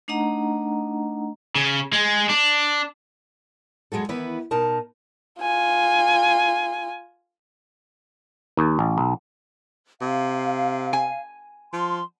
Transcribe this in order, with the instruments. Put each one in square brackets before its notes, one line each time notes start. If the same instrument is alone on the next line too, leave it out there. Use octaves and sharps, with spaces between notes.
[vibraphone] A3 D4 D#4 D#5 F#5 A#5
[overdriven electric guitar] C#3
G#3
D4
[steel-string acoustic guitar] F2 F#3 G#3 F#4 A4
D#3 E3 B3 E4 B4
B2 D#4 A#4 A5
[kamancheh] F4 G#5
[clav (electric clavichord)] D#2
A1
B1
[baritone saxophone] C3 [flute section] F5
[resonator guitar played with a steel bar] G#5
[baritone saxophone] F3 [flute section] C6